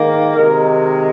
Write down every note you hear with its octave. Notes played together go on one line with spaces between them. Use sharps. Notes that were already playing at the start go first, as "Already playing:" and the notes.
Already playing: G#2 D#3 A#3
C3 D#3 G#3 A#4